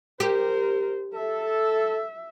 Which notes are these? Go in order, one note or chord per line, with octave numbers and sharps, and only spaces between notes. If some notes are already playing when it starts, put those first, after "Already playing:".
G4 A#4 C5
A4 E5